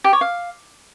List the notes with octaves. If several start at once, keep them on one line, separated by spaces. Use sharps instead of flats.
G4
C#5
F5